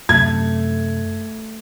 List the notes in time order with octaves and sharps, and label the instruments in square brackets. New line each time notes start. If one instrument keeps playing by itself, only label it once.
[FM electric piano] F#2 C3 [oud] A3 [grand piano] G#6